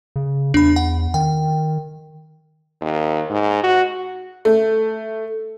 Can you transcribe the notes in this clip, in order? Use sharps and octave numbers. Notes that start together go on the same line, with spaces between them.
C#3
E2 D4 B5
F#5
D#3 G5
D#2
G#2
F#4
A3